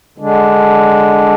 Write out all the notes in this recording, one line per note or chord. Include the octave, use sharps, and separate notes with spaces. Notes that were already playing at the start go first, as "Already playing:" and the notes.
D3 G#3 D4